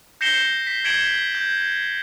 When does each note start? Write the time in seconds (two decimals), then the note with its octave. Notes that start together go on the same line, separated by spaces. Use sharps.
0.21 G6 A#6 C7 C#7 E7 G7
0.67 B6
0.85 G#6 B6 C#7 D7 E7 F#7
1.35 G6